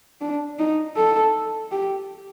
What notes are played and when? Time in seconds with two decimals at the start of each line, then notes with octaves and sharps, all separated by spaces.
0.21 D4
0.59 D#4
0.97 A4
1.72 G4